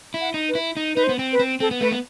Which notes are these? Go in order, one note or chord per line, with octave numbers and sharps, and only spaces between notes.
E4
F#5
D#4
B4
E4
D#4
D#4 B4
C5
B3
C4
B4
C4
C4 A4
B3
A3 B4
B3